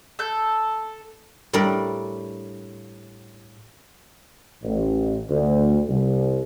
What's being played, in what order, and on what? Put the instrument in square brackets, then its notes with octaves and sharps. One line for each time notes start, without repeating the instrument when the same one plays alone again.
[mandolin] A4 G6
[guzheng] A2 G3 D4 A#4 D5
[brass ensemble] A1
D2
C2